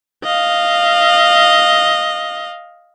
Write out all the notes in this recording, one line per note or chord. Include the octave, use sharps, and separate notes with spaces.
D#5 F5